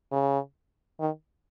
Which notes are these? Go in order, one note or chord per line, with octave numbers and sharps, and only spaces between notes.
C#3
D#3